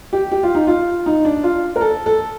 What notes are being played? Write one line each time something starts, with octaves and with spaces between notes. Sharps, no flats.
G4
G4
F4
D#4
F4
D#4
D4
F4
A#4
A4
A4